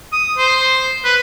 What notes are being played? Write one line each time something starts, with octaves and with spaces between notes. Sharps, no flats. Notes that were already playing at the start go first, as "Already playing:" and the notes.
D#6
C5
B4